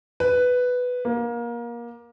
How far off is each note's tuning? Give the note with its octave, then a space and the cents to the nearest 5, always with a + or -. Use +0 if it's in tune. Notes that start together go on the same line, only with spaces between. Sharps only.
B4 +5
A#3 +25